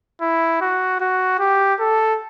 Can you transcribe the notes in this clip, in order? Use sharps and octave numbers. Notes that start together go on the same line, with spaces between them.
E4
F#4
F#4
G4
A4